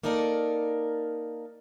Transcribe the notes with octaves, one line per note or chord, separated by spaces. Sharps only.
A#3 D#4 A4 A#4 D5